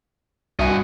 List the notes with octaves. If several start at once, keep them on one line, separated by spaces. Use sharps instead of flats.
C2 G2 F#4 D#5 E5 G#5